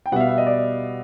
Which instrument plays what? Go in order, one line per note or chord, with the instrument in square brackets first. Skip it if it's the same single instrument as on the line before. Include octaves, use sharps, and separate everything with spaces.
[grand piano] G5
B2 G3 B3 E5 F#5
F5
E5
D#5
D5